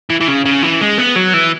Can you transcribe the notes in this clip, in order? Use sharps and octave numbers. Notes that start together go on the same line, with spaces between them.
E3
E3
C#3
C#3
E3
G#3
B3
F#3
E3